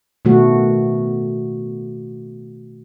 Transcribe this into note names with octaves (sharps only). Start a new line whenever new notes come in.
B2 D#3 A3 F#4